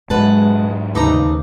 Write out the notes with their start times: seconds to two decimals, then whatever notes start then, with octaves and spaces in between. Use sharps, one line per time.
0.10 G#2 F#3 G#3 B4 F#5 A5
0.95 D#2 C#3 A3 D#4 B4 C5 A#5 D6